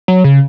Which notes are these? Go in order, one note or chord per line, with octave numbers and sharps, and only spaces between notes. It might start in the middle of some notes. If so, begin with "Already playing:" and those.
F#3
C#3